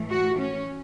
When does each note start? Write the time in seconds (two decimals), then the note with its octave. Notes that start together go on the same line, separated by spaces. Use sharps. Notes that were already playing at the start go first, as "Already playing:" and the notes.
Already playing: A2 E3 A3
0.10 F#4
0.39 C#4